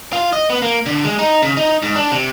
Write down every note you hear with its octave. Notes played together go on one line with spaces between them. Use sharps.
F4
D#5
B3
A#3
D3
G#3
D#4
C#3
D#4
G#2
D4
C3